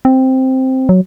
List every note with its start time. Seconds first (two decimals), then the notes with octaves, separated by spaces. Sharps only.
0.05 C4
0.89 F#3